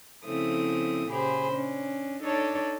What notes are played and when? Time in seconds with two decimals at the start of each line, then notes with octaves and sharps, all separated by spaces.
0.24 C#3 F3 A3 C4 E4 D#6
1.08 A#2 C#3 G4 G#4 C5 B5
1.51 C#4 D4
2.21 D4 D#4 A4 C#5 D5 A5